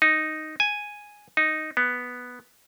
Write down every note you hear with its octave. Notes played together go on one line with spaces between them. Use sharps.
D#4
G#5
D#4
B3